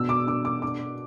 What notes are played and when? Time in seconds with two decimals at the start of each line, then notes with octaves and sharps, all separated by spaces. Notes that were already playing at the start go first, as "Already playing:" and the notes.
Already playing: B2 D4 E6
0.09 D6
0.27 D4 D6
0.45 D6
0.62 D4 D6